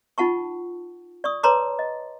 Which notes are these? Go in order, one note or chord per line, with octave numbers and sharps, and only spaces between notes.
D#4 F4 F#5 A5 C#6
D5 C#6 D#6
B4 C#5 A5 A#5 C6 D6
D#5